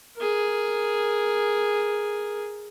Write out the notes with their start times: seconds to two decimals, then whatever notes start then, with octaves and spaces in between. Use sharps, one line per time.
0.17 G#4 A#4